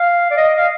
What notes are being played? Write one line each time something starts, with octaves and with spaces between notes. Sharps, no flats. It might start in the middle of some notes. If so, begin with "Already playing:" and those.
Already playing: F5
D5
D#5
F5